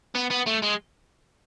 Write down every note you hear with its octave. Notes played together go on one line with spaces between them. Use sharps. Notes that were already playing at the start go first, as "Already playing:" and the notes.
B3
B3
A3
G#3